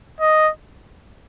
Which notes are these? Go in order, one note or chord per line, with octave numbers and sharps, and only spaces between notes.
D#5